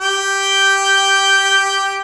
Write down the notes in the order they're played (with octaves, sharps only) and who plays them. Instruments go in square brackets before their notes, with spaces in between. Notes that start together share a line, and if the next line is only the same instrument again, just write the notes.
[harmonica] G4 G5